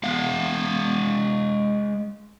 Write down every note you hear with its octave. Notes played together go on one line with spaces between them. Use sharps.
G#3 F5 F#5